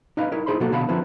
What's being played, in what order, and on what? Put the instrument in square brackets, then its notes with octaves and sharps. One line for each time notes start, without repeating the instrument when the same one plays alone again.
[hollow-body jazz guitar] D#4 B4 D#5 F5 B5
E4 A#4 E5
D#4 E4 G#4 C5 B5 C6
B2 F#3 A#3 F#4 A4
B2 D3 B3 F5 A5 B5
D3 F3 C4 E4 B4